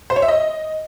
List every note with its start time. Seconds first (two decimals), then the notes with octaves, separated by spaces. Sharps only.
0.10 C5
0.16 C#5
0.22 E5
0.28 D#5